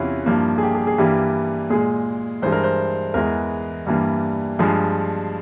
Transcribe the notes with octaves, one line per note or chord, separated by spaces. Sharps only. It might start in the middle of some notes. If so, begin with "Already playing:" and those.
Already playing: E2 C3 E3 C#4 E4 F4
G2 F3 A#3
G#4
G4
G#4
G#4
G2 E3 G3 A#3 G4
A#2 G#3 G#4
G2 E3 G#3 C5
A#4
C5
E2 E3 G#3 A#4
G2 E3 G3 A#3
G2 F3 G#3 G#4